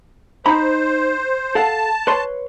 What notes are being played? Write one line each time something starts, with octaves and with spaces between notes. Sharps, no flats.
D#4 C5 A#5 B5
A4 F5 F#5 A5
B4 C#5 C6